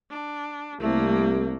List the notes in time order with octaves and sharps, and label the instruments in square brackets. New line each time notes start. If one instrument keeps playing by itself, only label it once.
[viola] D4
[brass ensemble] C2 [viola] A3 A#3